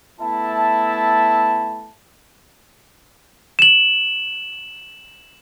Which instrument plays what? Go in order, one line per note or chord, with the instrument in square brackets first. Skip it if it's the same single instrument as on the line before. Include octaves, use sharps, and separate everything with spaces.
[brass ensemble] A3 B3 E4 E5 A5
[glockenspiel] E7 F#7